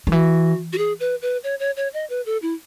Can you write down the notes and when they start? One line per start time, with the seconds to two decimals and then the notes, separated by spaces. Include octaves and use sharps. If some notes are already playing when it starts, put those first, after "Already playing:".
0.07 D#3
0.12 E3 F#4
0.73 F#4
0.78 G#4
1.00 B4
1.22 B4
1.44 C#5
1.60 C#5
1.77 C#5
1.94 D#5
2.10 B4
2.26 A4
2.42 E4